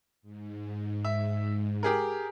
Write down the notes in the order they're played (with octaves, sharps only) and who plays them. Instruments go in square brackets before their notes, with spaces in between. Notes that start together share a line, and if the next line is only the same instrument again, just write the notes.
[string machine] G#2
[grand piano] E5
G4 G#4 A#4